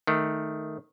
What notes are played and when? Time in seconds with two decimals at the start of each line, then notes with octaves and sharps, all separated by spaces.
0.07 D#3 A3